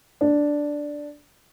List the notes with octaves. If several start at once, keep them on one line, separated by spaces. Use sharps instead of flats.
D4